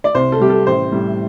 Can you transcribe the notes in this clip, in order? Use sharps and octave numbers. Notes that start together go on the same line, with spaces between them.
D5
C2 C5
A4
C3 G3 G4
A4
A1 C5
A2 G3